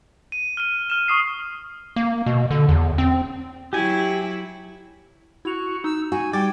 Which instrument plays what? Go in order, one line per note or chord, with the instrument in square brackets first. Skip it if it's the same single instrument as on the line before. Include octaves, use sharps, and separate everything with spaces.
[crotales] D#7
F6 D#7
F6 E7
C#6 D#6 C7
[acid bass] A#3
B2
D3
E2
C4
[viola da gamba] F#3 E4 [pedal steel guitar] G4 G#5
[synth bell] E4 F7 [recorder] F#4
[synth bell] D#4 [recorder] E6
[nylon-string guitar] F#4 [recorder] G#5
[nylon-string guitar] G3 [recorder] G5 [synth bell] D6 G#6 A6